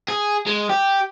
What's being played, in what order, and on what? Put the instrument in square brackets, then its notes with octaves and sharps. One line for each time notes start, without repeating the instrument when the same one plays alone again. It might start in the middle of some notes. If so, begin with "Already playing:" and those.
[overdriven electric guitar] G#4
G#3
G4